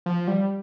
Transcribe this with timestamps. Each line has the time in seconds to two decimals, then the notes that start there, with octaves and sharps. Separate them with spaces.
0.06 F3
0.27 G3